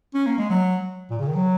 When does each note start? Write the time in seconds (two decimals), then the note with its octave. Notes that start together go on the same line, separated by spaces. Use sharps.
0.14 C#4
0.27 A#3
0.38 G#3
0.50 F#3
1.10 A#2
1.19 C#3
1.28 D#3
1.35 F#3